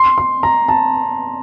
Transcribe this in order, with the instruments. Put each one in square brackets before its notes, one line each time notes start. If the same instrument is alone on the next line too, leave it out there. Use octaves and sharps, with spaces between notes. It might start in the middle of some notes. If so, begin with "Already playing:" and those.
Already playing: [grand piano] C6
C6
A#5
A5